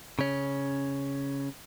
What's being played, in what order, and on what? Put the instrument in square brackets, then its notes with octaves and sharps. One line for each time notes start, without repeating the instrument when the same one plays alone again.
[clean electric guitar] C#3 C#4